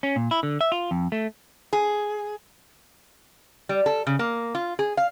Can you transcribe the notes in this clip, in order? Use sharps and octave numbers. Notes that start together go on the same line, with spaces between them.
C#4
A#2
E4
D3
E5
F4
F2
A3
G#4
G3
A4
C#3
A#3
F4
G#4
F5